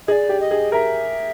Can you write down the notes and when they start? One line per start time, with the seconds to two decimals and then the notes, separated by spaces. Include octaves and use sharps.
0.08 G#4 D#5
0.12 D5
0.29 G4
0.40 D#5
0.51 G#4
0.72 A#4 E5